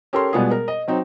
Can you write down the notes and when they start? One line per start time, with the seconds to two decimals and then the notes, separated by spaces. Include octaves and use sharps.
0.13 C#4 G4 A4 A#4 C#5 C6
0.33 B2 G3 G#3 B3 F4 G#4
0.51 A#4
0.68 D#5
0.88 F#3 C4 D#4